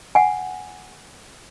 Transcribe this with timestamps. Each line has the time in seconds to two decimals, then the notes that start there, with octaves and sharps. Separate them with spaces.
0.15 F#5 G#5